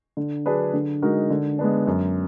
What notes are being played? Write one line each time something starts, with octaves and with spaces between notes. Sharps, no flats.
D3
F#3 D4 G#4 B4
D3
G#3 D#4 F#4 A#4
D3
G#3 B3 D4
F#2